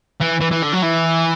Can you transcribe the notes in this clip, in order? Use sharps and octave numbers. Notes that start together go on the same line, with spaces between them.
E3
E3
E3
D3
F#3
E3